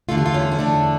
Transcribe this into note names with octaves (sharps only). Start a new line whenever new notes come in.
E2 D3 A3 F4
G4
F4
C#4
C#4
E2 D3 A3 D4